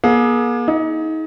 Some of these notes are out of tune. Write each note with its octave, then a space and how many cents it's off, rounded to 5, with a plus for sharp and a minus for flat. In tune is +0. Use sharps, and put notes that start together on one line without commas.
A#3 +45 G#4 +25
D#4 +30 G#4 +25